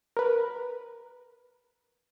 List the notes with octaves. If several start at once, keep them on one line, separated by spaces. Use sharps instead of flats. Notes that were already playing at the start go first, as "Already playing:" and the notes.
A#4 B4